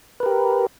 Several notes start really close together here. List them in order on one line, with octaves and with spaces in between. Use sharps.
B4 A#4 G4